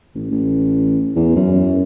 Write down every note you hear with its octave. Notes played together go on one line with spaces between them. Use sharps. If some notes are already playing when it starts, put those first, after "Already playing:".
A1
A1
E2
F#2